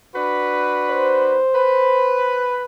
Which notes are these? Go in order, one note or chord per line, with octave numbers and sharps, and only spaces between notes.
D4 F#4 B4
C5
B4